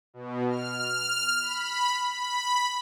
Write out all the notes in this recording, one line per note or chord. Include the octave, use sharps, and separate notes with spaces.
B2
F6
B5
B5